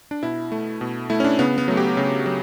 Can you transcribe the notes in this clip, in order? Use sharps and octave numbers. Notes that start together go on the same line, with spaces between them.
D4
B2 E4
A3
B2
A3 E4
C#4
D4
C#3 B3
B3
F#3 A3
G4
C#3
F#3